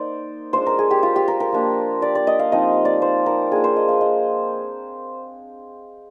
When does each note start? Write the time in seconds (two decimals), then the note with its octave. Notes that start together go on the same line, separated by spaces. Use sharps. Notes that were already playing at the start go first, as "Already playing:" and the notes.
Already playing: A#3 D#4 C5 D5
0.53 G#3 D4 F4 C5
0.66 A#4
0.79 G#4
0.91 G4
1.03 F4
1.16 G4
1.28 A#4
1.40 A#4
1.52 F3 A#3 D4
2.02 D5
2.15 D5
2.27 D#5
2.39 F5
2.52 F3 C4 D#4 D#5
2.85 D5
3.02 C5
3.26 A#4
3.51 A#3 D4 F4 G#4
3.64 C5
3.76 D#5
3.88 F5
4.01 D#5